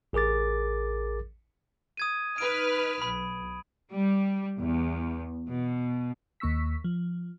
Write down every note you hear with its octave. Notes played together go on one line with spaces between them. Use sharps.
A1 G#4 A#4 D6 A6
D#6 G#6 D#7
D#4 B4 F6 D7
B1 B5
G3
E2
B2
D#2 A#3 C#6 E6 B6
F3